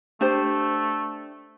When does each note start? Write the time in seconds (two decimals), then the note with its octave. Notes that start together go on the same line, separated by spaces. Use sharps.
0.21 A3 D4 G4 C5